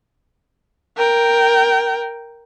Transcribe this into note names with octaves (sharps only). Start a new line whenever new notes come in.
A#4 G5